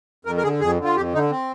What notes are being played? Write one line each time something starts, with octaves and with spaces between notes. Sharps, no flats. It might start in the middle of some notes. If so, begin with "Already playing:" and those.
F2 A#4
A#4
D3 G#4
F2 G#4
D3
F4
F2 G4
D3 D#4
C4